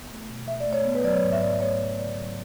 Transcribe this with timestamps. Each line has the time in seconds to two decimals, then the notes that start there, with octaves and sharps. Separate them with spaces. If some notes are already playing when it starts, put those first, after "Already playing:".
Already playing: B3
0.10 A3
0.29 B2
0.48 B2 E5
0.60 D5
0.67 A3
0.73 C#5
0.85 B3
0.95 B4
1.04 F#3 D5
1.13 C#5
1.22 G#2
1.32 E5
1.41 F#3 D5
1.52 E5
1.60 A3 C#5
1.79 A3
1.98 C#3 D5
2.16 F#3